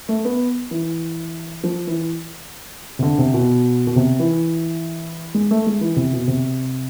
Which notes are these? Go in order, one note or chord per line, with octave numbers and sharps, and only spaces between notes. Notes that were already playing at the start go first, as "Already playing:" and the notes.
A3
B3
E3
F3
E3
C3
D3
C3
B2
B2
C3
E3
G#3
A3
G#3
E3
C3
B2
C3